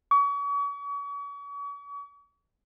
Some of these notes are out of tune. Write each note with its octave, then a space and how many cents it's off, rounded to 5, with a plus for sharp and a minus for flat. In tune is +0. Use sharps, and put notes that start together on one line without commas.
C#6 +40